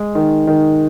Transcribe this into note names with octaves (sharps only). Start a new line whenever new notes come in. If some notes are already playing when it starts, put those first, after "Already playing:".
Already playing: G#3
D#3
D#3